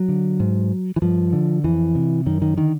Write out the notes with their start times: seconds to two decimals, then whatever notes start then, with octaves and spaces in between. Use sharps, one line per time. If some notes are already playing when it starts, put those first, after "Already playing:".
Already playing: F#3
0.09 D3
0.40 G#2
0.96 E3
1.02 G2 F3
1.33 D3
1.64 F2 E3
1.95 C3
2.26 F#2 D#3
2.42 D#3
2.57 D3 D#3